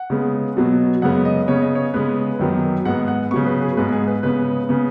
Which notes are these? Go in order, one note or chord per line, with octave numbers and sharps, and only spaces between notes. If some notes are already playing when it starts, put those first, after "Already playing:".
Already playing: F#5
C#3 G#3 B3
B2 F#3 B3
F#2 C#3 G#3 B3 F#5
D#5
C#3 B3 C#5
D#5
C#5
C#3 G#3 B3 B4
F#2 D#3 F#3 B3
G#2 G#3 B3 F#5
F#5
C#3 F#3 B3 C#6
B4
G#4
G#2 G#3 B3 B4
G#4
B4
C#3 G#3 B3 B4
C#3 B3